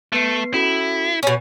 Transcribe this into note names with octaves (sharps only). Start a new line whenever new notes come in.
A3 B3 B4 C7
C#4 E4 F#4 A4
B2 C#4